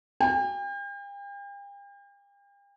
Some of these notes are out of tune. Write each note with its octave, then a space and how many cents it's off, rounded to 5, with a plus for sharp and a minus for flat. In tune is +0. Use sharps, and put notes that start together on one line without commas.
G5 +40